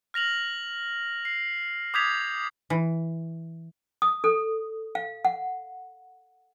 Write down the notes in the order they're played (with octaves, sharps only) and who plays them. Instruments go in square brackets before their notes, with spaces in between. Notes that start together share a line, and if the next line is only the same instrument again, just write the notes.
[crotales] F6 A#6 F7 F#7
C7
D6 D#6 G6 G#6 B6 F7
[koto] E3
[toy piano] D#6
A4
F5
F#5